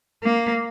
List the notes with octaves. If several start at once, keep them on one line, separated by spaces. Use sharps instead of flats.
A#3